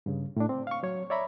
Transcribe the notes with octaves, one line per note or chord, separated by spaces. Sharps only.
G2 C#3
A2 D4
C4
F5 C#6
F#3 C#5
C#5 D5 E5 A#5 B5